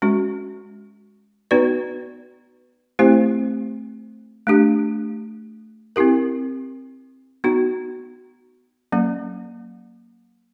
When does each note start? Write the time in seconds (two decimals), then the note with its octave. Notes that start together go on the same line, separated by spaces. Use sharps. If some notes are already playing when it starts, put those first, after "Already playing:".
0.02 G#3 C#4 F#4
1.51 B3 D#4 F#4 B4 D5
2.99 A3 C4 E4 G4 C5
4.47 A3 D4 G4
5.96 C4 E4 G4 A#4
7.44 B3 D#4 F#4
8.92 F#3 A#3 C#4